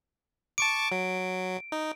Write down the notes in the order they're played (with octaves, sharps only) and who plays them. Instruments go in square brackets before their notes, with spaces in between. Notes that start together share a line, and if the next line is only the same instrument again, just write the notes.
[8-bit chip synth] A5 C#6 D6 [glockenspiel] D7
[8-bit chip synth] F#3
D#4